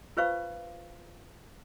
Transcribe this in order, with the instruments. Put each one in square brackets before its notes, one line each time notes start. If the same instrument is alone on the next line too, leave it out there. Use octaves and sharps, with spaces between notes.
[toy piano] F4 B4 C5 F5 C#6